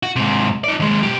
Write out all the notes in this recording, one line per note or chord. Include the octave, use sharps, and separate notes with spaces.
F#4
G#2 C3
D#4 D5
D#2 G#3
B2 G4